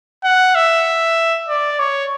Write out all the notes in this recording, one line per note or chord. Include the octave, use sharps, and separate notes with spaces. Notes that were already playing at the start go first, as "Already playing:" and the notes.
F#5
E5
D5
C#5